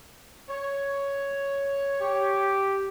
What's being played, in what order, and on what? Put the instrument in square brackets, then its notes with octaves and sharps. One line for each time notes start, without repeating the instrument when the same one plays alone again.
[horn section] C#5
[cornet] G4